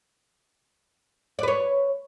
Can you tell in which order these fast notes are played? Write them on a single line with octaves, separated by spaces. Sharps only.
D5 B4 C#5